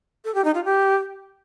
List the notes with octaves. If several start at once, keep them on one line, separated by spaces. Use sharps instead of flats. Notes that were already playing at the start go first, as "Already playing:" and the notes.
A4
G4
D#4
F4
G4